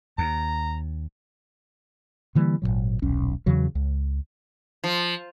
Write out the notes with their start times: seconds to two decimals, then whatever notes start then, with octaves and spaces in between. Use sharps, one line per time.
0.18 D#2 A#5
2.35 D3 E3 G3 A#3
2.62 G#1 D#2 A#2 F#3
3.02 D#1 B1 C#4
3.46 E2 C#3 E3 F#3
3.75 C#2
4.84 F3